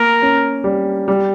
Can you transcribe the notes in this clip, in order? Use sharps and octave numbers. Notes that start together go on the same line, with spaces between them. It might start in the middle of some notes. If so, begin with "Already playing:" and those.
Already playing: A#3 A#4
C#4
G3
G3